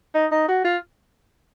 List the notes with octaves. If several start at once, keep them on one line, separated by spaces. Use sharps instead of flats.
D#4
D#4
F#4
F4